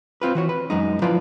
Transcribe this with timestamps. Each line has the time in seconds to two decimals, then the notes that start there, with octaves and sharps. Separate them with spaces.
0.22 C4 F4 B4
0.35 E3 F#4 C#5
0.49 B4
0.70 F#2 G#3 D#4
1.02 F3 E4 F4 B4 D5 F5